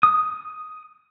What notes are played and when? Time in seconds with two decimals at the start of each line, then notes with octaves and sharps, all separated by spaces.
0.03 D#6